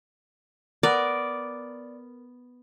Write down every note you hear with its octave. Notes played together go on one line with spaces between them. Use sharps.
B3 A#4 D5